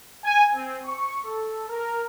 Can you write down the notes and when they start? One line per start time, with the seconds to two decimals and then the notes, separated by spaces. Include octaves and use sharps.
0.24 G#5
0.55 C4
0.85 C#6
1.25 A4
1.69 A#4